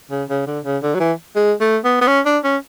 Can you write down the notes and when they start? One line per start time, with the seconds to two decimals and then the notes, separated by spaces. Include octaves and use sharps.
0.11 C#3
0.29 C#3
0.47 D3
0.65 C#3
0.82 D3
0.94 F#3
1.00 E3
1.36 G#3
1.61 A3
1.84 B3
2.01 B3
2.08 C#4
2.25 D4
2.44 C#4